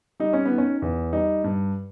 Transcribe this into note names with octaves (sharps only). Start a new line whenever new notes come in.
G3 D#4
C#4
B3
D#3
C#4
E2
G3 D#4
G2